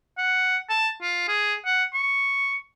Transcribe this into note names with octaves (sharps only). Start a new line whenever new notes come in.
F#5
A5
F4
G#4
F#5
C#6